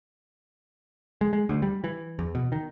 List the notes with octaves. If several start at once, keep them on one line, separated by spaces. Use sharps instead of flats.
G#3
G#3
D2
G3
E3
E2
B2
D#3